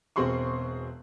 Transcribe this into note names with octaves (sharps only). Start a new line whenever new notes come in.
E1 B2 C4 G#4 C6 C#6